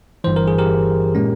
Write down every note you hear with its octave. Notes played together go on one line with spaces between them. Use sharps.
G1 G2 E3 C5
A#4
G#4
G4 A#4
A#2 G#3 C#4